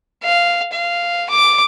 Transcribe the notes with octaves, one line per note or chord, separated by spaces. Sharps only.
F5
F5
D6